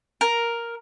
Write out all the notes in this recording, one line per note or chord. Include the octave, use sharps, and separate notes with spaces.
A#4